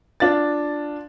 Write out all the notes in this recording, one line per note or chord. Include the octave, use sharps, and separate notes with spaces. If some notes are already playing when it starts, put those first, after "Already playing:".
D4 F4 A6